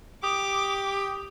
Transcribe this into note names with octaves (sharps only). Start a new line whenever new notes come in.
G4 D6 D#6